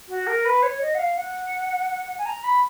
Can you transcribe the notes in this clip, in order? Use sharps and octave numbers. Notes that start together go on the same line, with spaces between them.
F#4
A#4
B4
C#5
D#5
F#5
F5
F#5
G#5
A#5
B5